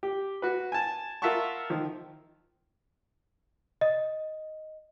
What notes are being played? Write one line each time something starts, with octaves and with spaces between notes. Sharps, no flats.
G4
F#4 B4
G#5 A5
F4 A#4 E5 F#5 A5 C#6
D#3 F3
D#5